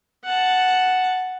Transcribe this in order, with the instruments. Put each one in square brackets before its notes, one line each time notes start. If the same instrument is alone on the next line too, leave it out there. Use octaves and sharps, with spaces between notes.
[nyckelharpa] F#5 A5